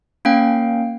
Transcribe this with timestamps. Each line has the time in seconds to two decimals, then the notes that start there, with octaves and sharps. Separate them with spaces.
0.25 A#3 C#4 F5 G5